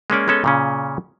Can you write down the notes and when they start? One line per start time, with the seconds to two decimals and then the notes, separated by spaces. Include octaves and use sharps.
0.10 G#3 A#3 C#4 D5
0.28 G#3 B3 C#4 A4
0.44 A#2 C#3 C#4